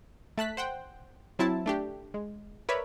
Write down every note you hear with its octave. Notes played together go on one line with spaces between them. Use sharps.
A3 A5 F#6 B6
C5 F#5 G5
F#3 C4 E4 A5
A3 D4 G4
G#3
A#4 B4 C#5 D5 E5 B5